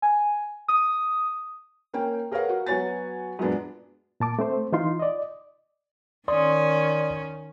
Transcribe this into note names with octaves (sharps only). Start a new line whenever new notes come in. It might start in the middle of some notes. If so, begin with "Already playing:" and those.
G#5
D#6
A#3 C#4 G5
G#4 A#4 B4 C#5 F5 F#5
F#4
F#3 B3 F#4 C#5 G#5 A6
F#2 A#2 G#3 B3 D4
A#2 A5 D6
A3 C4 C5
E3 D#4 F4 C6
D5 D#5
D#3 C#4 D5 C6 D#6